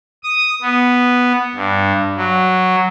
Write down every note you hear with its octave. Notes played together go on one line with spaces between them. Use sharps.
D#6
B3
G2
F#3